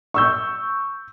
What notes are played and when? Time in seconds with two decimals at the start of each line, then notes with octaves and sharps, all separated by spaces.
0.14 C#6 E6 G6